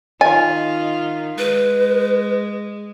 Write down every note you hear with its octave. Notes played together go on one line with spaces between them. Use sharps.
D#3 F4 D#5 G#5
G#3 B4